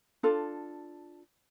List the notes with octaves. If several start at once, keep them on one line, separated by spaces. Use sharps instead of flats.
D4 F4 A4